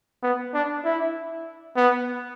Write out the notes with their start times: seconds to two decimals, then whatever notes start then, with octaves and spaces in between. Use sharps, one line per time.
0.23 B3
0.54 D4
0.84 E4
1.77 B3